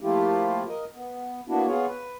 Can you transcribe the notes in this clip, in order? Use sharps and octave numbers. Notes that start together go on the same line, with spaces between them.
F3 A3 A#3 E4 F4 G4
A#4 D#5
B3
A#3 B3 D4 E4 F#4
B3 F4 G#4 C#5
B4